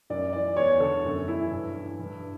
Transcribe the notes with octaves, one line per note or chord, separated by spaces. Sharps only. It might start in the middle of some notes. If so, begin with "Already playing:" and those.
F#2 D5
E3 D5
E2 C#5
D3 A4
F#2
E3 E4
G2
E3
G2